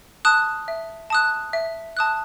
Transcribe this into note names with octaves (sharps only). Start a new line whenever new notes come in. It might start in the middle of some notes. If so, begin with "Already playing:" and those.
A5 D#6 F#6
E5
A5 D#6 F#6
E5
A5 D#6 F#6